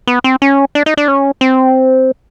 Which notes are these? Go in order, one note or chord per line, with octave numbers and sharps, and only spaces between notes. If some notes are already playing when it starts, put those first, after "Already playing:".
B3
C4
C#4
D4
D#4
D4
C#4
C4